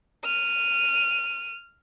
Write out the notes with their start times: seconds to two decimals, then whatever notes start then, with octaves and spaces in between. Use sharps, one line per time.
0.24 F6 D#7